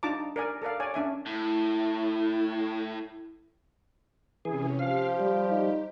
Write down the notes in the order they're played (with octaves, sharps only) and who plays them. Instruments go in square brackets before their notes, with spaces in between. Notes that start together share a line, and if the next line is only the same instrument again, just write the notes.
[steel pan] D4 D#4 F4 A5 A#5 D6
A#4 D5 G#5
A4 A#4 D5 F5
C#5 D5 G#5
C#4 D4 E5 G#5
[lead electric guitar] A2 [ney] E4
[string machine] C3 C#4 [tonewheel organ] E3 G#4
[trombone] F3 [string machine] G4 [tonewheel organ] F5
[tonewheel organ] G3
[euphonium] D#4